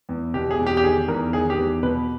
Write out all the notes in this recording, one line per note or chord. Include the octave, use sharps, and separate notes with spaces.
E2
B2 G4
G#4
E2
G4
G4
D#3 G#4
E2 A#4
D#3 G#4
G4
E2
B2 B4